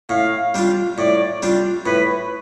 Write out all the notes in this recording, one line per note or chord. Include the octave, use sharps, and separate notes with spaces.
A2 F5
G3 D4 F4
A2 D5
G3 D4 F4
A2 B4